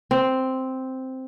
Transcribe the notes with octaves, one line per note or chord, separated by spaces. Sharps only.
C4